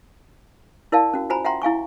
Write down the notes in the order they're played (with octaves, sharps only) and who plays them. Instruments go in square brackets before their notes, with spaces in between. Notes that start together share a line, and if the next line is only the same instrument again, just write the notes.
[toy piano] E4 A#4 D5 F5 A5
C#4 F#4
F4 F#4 C5 G#5 A#5 B5
E5 F#5 G5 A#5 C6
E4 F5 G#5 C#6